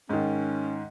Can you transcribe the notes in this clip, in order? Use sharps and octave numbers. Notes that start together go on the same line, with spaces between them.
G#2 D#3 C#4